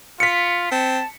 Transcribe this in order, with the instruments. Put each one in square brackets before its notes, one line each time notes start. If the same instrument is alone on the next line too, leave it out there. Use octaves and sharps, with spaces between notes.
[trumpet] F4 [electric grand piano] B6 C#7
[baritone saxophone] C4 [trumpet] A5